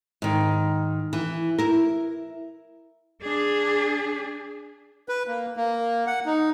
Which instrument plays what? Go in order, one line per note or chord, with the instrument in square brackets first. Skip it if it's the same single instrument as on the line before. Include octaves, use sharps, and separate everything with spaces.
[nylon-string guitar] G#2 D#3
E3
E4 A#4
[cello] D4 G#4
[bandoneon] B4
A#3
A#3
F#5
D#4